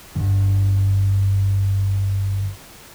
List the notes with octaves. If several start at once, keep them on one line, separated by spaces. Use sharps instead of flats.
G1 G2 D3